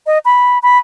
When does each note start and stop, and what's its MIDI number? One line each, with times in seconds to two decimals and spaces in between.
0.06 0.18 75
0.25 0.58 83
0.63 0.78 83